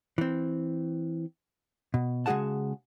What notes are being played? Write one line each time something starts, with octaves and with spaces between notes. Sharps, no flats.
E3 C4
B2
C#3 G#3 F#4 G#4 F#5 A5